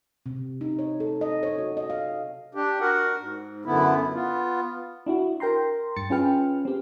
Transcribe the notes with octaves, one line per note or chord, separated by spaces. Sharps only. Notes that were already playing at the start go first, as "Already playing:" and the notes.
C3
D#4
C#5
A4
D#5
C#5
F#4
D#5
F5
D4 G4
F#4 A#4 F#5
G#2
F#2 D3 B3 E4
B3 F4
D4 E4 F#4
A#4 G5 A#5 C6
G2 A6 C#7
C#4 F4 G#4 B4 G5 F6
C4 G4